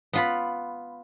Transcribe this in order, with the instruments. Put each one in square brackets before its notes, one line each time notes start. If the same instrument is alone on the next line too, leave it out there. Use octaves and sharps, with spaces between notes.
[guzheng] B3 F4 B5